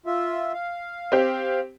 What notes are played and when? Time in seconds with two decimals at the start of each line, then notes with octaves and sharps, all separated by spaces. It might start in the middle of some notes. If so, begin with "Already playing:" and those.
0.06 F4 E5
0.53 F5
1.12 C4 G4